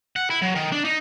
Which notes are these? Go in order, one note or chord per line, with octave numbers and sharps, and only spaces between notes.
F#5
E4
F#3
D#3
D4
D#4